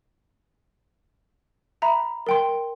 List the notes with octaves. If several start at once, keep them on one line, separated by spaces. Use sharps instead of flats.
E5 A#5 B5
A#4 G5 C6